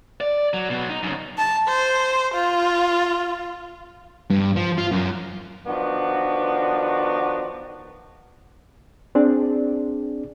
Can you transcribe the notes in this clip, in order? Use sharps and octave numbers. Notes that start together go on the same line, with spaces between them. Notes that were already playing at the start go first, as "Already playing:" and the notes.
D5
F#3
B2 F#3
D#4
F#2 C#3
A5
C5
F4
G2
F3
F4
F#2
D#3 F3 B3 D4 F#4
C4 D4 G#4 D5